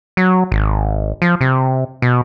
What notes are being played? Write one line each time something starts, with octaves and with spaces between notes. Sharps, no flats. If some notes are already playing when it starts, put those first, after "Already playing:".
F#3
G#1
F3
C3
B2